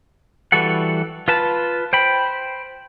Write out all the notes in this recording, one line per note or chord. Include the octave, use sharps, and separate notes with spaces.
E3 G3 F#4 A4 F#5
F4 B4 A5
C5 G5 B5